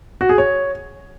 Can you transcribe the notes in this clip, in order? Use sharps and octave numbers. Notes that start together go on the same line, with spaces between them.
F#4
G#4
C#5